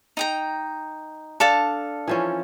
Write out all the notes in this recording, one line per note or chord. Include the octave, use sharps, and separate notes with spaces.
D#4 G5 A#5
D4 A4 F5 A5
E3 F3 C#4